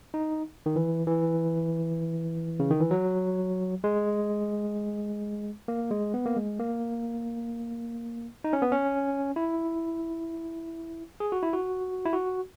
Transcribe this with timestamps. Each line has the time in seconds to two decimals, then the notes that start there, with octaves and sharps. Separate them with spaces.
0.14 D#4
0.66 D#3
0.76 E3
1.07 E3
2.60 C#3
2.70 D#3
2.80 E3
2.91 F#3
3.84 G#3
5.68 A#3
5.91 G#3
6.14 B3
6.26 A#3
6.37 G#3
6.59 A#3
8.44 D#4
8.53 C#4
8.62 B3
8.72 C#4
9.36 E4
11.20 G#4
11.32 F#4
11.43 E4
11.53 F#4
12.06 E4
12.13 F#4